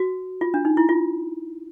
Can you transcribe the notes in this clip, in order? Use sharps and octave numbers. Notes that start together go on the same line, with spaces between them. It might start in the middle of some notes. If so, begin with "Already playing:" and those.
Already playing: F#4
F4
D4
D#4
E4
F4